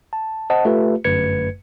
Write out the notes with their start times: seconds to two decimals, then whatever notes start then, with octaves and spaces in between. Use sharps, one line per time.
0.13 A5
0.50 C5 D#5 F#5 A5
0.65 A3 F4 G4 B4
1.04 G1 F#2 A3 B4 G#6 C#7